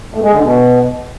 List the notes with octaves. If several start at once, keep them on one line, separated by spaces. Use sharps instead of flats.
A2
G#3
D3
B2